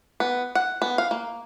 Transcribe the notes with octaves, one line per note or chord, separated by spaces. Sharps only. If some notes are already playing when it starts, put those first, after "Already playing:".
B3
F#5
B3
F5
A#3